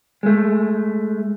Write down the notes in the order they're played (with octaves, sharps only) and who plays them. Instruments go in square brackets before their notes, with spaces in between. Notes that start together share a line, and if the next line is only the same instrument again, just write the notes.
[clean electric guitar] G#3 A3